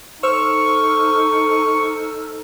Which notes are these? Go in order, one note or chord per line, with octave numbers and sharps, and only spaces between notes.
D#4 A4 C5 C#6 E6 F6